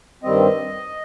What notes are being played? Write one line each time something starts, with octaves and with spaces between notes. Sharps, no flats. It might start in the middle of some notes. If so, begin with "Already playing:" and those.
G2 D#3 G3 C4 D#5